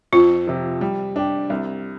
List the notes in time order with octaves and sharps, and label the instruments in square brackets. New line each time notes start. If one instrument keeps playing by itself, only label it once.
[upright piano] F2 [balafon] F4
[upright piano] C3 F3
G3
D4 G4
C2